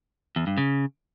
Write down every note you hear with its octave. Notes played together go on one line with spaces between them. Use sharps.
E2
G2
C#3